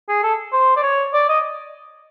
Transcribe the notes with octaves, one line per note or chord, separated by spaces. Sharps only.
G#4
A4
C5
D5
C#5
D5
D#5